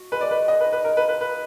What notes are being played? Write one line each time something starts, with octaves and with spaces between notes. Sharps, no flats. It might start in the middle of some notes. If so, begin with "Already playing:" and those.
Already playing: F#4
G#3 B4
D5
G#3 B4
G#4 D#5
B4
D#4
B4
G#4 A#4
B4
F5
B4
D#4 B4